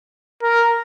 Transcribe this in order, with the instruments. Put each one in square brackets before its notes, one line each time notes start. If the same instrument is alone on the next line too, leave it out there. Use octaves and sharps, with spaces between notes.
[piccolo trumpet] A#4